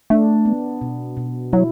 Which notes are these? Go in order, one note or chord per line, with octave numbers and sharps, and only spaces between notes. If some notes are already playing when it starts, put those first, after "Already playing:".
A3 D4
B3
B2
B2
F#3 E4